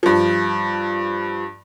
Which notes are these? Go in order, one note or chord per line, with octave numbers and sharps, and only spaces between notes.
G2 F3